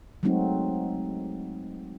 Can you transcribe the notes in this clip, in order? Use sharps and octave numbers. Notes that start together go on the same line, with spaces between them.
F#3 G#3 A3 C4 D#4 F#4